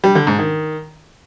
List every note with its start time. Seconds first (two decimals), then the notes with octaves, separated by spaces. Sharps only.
0.04 G3
0.15 D3
0.27 G#2
0.39 D#3